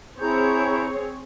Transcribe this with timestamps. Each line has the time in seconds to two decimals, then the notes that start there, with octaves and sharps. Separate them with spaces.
0.20 C4 E4 G#4 C#5 A#5 G6